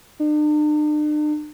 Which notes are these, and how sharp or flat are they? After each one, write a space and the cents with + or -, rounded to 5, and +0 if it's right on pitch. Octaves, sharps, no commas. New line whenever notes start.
D4 +45